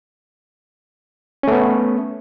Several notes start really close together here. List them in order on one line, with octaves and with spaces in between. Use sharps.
C#4 A3 B3